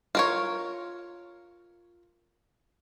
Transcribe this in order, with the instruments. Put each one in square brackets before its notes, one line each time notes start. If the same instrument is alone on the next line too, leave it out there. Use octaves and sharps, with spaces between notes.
[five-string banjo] F4 A#4 C#5